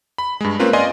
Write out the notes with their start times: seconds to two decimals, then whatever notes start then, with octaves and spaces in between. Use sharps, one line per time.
0.18 B5
0.41 G2 G#3
0.59 A#3 C4 C#4 F4 A#4 B4
0.73 D5 D#5 F5 G#5 C6